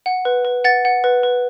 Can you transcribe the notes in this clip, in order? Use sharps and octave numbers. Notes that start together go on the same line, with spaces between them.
F#5
B4
B4
F#5 A6
F#5
B4
B4